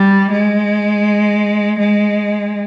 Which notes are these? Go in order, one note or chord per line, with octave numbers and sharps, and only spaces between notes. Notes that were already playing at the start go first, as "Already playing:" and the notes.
Already playing: G3
G#3
G#3